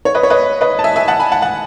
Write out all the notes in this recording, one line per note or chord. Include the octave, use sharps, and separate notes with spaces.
C#5
B4 D#5
C#5
B4 D#5
B4 D#5
A5
E5 G#5
E5 G#5
F#5 A5
G#5 B5
F#5 A5
F#5 A5